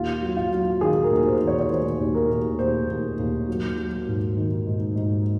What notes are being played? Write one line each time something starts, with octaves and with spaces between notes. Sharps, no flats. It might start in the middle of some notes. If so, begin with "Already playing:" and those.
Already playing: D#2 F4
F#3
F4
F#3
D#3 G#4
A#4
D#2
C5
D#3
C#5
C#5
D#3 C5
D#2
A#4
D#2
D#2 C5
D#2
D#2
F#3
F#3
G#2
D#3
G#2
G#2